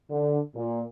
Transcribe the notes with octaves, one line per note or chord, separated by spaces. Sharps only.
D3
A#2